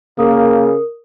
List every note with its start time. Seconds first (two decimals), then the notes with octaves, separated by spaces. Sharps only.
0.19 C#3 A#3 A#4 D#6